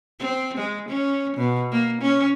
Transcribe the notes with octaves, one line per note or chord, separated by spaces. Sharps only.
C4
G#3
C#4
B2
A#3
C#4